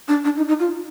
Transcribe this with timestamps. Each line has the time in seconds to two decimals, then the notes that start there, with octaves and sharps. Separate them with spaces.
0.08 D4
0.24 D4
0.37 D#4
0.48 D#4
0.60 F4